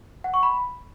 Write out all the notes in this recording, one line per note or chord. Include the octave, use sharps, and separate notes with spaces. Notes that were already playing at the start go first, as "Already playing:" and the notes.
F#5
C#6
B5